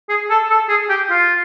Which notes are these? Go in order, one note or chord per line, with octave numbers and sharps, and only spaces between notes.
G#4
A4
A4
G#4
G4
F4